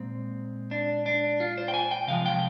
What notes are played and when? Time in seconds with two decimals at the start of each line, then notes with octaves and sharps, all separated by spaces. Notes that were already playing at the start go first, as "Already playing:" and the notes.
Already playing: A#2 G#3 C4
0.71 D4
1.06 D4
1.40 F4
1.57 C5
1.68 G5
1.74 G#5
1.91 G5
2.08 C3 F3 G#3 F5
2.26 G5